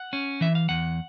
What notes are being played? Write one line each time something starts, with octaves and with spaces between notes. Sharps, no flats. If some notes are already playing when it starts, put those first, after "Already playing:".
Already playing: F#5
C#4
E3 E5
F5
E2 F#5